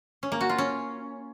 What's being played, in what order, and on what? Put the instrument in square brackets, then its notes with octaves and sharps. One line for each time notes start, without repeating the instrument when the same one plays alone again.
[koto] C#4
A#3
F#4
F4
C#4